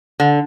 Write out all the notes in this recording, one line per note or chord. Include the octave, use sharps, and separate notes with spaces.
D3